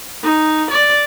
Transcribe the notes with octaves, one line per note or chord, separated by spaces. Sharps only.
D#4
D5